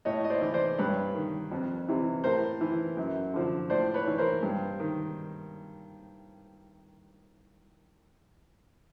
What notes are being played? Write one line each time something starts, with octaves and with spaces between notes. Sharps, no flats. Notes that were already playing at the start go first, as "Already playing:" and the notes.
A2 C#5 D#5
D#5
C5 D5
E3
C5 D5
G2 B4 C#5
D#3
F2
C3 E3
A2 A#4 C5
E3
F#2
D3 F3
A2 C5 D5
B4 C#5
E3
A#4 C5
G2
D#3